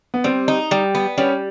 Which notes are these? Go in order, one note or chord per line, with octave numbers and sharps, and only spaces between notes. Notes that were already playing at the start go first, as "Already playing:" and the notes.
B3
G3 C4
D#4
G3
B3
G3 C#4